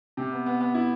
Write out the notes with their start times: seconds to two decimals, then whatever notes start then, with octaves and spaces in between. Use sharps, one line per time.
0.17 C3
0.32 B3
0.46 B3
0.61 B3
0.75 E4